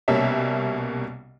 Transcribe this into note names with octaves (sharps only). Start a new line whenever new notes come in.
C2 B2 G3 A#3 C#4 E5